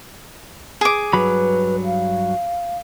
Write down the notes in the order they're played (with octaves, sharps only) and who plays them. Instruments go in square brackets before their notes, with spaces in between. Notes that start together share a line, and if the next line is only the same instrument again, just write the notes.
[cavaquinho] G#4 D6
[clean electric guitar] G2 F#3 B5 [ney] B4
[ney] F5